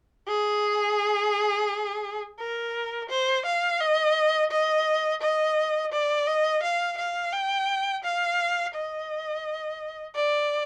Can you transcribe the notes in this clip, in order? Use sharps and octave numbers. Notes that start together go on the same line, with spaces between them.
G#4
A#4
C5
F5
D#5
D#5
D#5
D5
D#5
F5
F5
G5
F5
D#5
D5